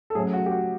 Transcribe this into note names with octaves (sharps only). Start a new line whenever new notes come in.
A4
A2 F#3 A3 C#4 G#4
F#4
G4
F#4